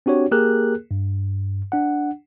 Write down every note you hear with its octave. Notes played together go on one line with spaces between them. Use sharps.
C4 D4 F#4 G4 C#5
A#3 G4 G#4 A#4 F#6
G2
D4 F#5